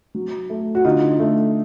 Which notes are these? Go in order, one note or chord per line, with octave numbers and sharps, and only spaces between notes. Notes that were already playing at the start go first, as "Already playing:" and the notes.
F#3
A3
F#4
D3 D#4 F4
A3